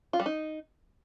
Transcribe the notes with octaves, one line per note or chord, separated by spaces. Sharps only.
F4
G3
D#4